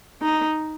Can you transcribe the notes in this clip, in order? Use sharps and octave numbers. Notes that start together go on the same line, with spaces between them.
D#4